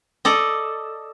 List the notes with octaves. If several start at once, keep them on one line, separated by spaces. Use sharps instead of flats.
A4 D5 D#5